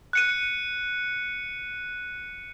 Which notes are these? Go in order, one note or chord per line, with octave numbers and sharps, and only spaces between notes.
F#6 C#7 D#7